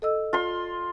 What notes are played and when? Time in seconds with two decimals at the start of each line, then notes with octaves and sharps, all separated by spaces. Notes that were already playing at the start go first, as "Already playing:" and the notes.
0.02 A4 D#5 E6
0.33 F4 C6